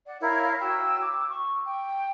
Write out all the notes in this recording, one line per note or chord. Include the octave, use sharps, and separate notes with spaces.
D5 F#5
E4 A#4 C#5 F5
F#4 G5 E6
D6
C#6
G5